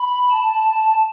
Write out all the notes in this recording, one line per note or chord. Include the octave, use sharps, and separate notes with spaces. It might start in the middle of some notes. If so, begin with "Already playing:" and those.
Already playing: B5
A5